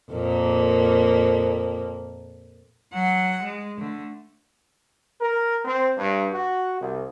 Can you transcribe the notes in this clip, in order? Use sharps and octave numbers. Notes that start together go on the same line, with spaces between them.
F2 A#2 A#3
F#3 F#5
G#3
D3 A3
A#4
C4
G2
F#4
C2